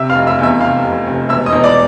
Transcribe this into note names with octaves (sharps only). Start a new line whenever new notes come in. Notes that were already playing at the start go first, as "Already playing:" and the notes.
Already playing: C3 E5 E6
F5 F6
F1
E5 E6
E2 E5 E6
C3 F5 F6
F1
F1
E1 E5 E6
D#5 D#6
E1
D5 D6